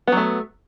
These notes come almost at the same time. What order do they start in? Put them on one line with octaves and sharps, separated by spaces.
B3 F#3 A3